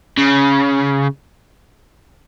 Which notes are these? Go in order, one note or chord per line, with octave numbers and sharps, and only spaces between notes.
C#3